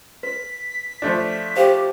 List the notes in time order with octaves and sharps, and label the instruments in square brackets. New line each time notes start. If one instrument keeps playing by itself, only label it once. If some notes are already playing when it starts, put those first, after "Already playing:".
[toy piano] B4 [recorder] B6
[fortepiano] F3 A3 D4
[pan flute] G4 [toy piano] C5 F5 G5